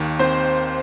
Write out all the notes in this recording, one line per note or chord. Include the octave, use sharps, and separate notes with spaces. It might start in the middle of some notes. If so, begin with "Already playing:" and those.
Already playing: D#2 D#3 A#3
C4 C5